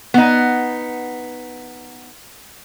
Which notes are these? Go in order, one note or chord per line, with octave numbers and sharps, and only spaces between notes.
B3 D#4